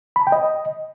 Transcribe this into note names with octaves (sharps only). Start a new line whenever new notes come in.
B5
A5
G5
D#5